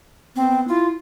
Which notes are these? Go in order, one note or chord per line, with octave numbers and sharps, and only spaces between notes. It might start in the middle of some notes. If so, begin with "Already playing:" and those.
B3 C4
E4 F4